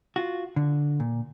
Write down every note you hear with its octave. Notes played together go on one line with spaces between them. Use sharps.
F4 F#4
D3
A#2